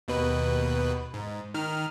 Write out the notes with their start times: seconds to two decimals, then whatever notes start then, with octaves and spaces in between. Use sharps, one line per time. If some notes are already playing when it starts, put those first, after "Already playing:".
0.08 D#2 B2 B4
1.14 G#2
1.54 D#3 F6